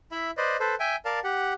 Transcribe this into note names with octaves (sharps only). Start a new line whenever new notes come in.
E4 E5 B5
B4 C5 D5 D#5
A4 B4 C5
E5 G5 G#5
A#4 D5 F5 A5
G4 F#5